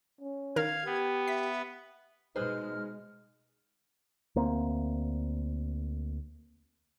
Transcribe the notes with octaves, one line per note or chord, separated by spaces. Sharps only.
C#4
D#3 A#4 F5 F6 G#6
B3 G4
E5 B6
B2 G#3 D#4 G#4 B4 C5 F6
D2 A#3 C4